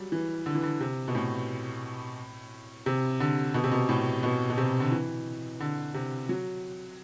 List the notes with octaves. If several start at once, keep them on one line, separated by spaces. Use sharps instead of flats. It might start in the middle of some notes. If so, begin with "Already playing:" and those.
Already playing: F#3 G3
E3
D3
E3
D3
C3
B2
A2
C3
D3
B2
C3
B2
A2
B2
B2
C3
D3
E3
D3
C3
F#3